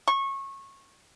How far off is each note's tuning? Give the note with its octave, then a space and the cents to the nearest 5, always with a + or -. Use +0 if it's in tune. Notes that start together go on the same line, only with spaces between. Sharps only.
C#6 -20